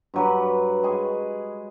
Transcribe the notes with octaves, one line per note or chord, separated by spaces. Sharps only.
G2 F#3 B4
G#3 G#4 C#6